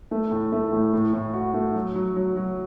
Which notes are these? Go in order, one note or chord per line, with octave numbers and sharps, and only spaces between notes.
A3
A2
A3
A2
A2
A2
F#4
A3
F#3
F#3
F#3
F#3